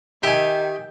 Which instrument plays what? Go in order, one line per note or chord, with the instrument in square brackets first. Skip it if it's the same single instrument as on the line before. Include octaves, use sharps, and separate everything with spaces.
[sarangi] D#3 [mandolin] G4 [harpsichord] E5 G#5